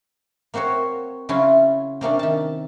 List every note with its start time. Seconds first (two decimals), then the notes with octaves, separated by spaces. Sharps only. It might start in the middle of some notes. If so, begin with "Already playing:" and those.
0.54 A#3 C4 F#4 C5 C#5
1.29 C#3 F#3 C#4 E4 F4
2.01 C3 A#3 C#4 D4
2.19 D#3 A5